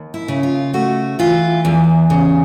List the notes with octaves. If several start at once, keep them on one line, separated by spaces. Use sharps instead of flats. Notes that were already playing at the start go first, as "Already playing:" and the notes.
Already playing: D#2
E4
C#3
F4
A3 F#4
E3 F4
E2
C#3